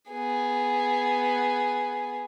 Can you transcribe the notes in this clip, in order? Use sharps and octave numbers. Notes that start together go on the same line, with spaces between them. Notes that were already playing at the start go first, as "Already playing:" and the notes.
B3 G#4